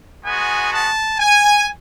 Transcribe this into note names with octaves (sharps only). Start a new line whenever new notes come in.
G#3 B3 F#4 G#5
A5
G#5